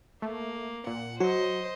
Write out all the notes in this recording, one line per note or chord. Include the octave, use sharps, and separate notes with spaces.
A3 A#3
A#2 F#5
F#3 F#4 C5 D#5